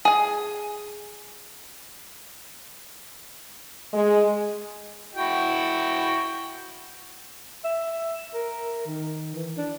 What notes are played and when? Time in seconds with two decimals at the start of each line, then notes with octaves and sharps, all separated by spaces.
0.05 G#4 G#5
3.94 G#3
5.16 E4 F#4 G5
7.65 E5
8.34 A#4
8.86 D#3
9.35 E3
9.57 D4